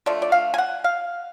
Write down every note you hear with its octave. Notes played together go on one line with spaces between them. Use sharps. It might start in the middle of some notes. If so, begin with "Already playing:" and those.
D3 F3 A3 D5
D5
F5
G#5
F#5
F5